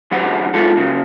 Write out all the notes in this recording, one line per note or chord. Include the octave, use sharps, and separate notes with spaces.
F#2 D3 E3 G4 F#5
E3 G#3 F4 A4
C#3 A#3